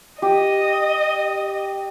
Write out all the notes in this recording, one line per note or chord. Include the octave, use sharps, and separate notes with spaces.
G4 D#5